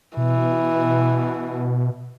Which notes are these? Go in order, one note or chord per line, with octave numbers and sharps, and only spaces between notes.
B2 E3